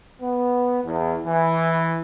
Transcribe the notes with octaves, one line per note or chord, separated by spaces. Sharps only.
B3
E2
E3